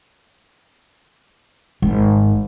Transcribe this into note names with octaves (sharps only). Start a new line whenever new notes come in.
G#1